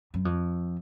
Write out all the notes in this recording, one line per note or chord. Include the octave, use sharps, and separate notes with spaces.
F#2
F2